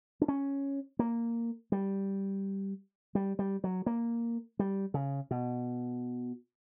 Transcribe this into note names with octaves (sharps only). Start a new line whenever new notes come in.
D4
C#4
A#3
G3
G3
G3
F#3
A#3
G3
C#3
B2